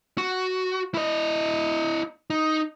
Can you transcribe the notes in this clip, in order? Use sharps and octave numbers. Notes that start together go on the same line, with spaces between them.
F#4
E4 D#5
D#4